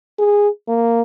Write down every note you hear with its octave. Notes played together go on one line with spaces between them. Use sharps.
G#4
A#3